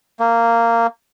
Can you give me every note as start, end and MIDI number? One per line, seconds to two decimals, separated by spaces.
0.20 0.87 58